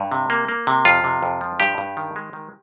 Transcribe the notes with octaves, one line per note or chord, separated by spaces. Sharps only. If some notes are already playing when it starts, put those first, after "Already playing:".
Already playing: G2
C3
A#3
A#3
C3
F2 F4
C3
F2
F3
G2 G4
G2
D#3
G#3
D#3